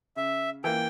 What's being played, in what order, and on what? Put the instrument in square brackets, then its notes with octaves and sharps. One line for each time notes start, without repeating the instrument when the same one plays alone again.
[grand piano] C#3 [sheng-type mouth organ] E5
[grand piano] E3 A#3 [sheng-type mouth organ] G5